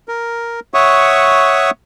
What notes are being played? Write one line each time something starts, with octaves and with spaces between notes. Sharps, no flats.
A#4
C#5 E5 F#5 C#6 D#6